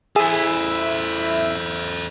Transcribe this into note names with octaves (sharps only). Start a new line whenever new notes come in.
E4 G#4 A4 C5 E5